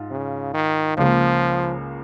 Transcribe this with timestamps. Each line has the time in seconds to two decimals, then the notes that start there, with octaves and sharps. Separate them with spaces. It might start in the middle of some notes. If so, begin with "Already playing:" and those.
Already playing: G#2 F4
0.11 C#3
0.54 D#3
0.97 C#2 C#3 F3 A#3